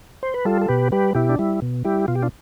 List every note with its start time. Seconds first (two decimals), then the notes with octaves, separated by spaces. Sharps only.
0.23 C5
0.34 B4
0.45 G3 F4 A4
0.61 A4
0.68 B2 G4 B4
0.92 G3 G4 B4
1.15 B2 E4 G4
1.29 D4
1.39 G3 E4
1.62 B2
1.84 G3 E4 G4
2.08 B2 F4
2.15 G4
2.22 D4 F4